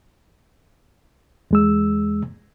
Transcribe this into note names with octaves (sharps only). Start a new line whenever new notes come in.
E2 G#3 E6